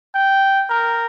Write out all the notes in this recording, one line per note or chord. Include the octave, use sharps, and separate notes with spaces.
G5
A#4